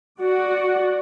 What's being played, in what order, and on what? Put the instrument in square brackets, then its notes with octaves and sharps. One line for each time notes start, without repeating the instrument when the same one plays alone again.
[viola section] F#4 D5